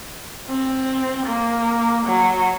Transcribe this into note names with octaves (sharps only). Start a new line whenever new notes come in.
C4
A#3
F#3